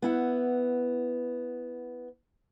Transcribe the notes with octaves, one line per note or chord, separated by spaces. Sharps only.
B3 E4 F#5